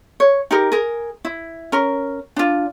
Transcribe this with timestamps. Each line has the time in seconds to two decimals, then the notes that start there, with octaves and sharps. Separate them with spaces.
0.20 C#5
0.51 D#4 G4 A#4
0.72 G#4 A#4
1.25 E4
1.72 C#4 A#4
2.36 D4 F4